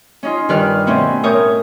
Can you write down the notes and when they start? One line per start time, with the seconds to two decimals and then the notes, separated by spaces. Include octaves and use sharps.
0.23 C#4 D#4 F4
0.49 G2 D#3 D4 B4 D5 F6
0.87 B2 A3 C4 C#4 E4 F#4
1.23 A2 A#4 C#5 D#6 G6